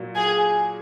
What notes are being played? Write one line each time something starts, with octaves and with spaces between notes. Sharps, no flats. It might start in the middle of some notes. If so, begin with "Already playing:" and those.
Already playing: A#2 F#3 A#3
G#4